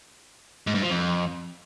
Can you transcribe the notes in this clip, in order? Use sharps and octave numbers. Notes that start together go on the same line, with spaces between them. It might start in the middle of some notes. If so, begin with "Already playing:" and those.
G#2
G2
F3
F2